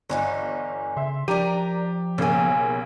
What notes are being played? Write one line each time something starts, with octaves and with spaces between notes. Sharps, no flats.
G1 D3 E3 D#4
C#3 E5 C6
F3 D4 G4 A#4 D5 A#5 D#7
B1 C#3 A#3 C5 G#5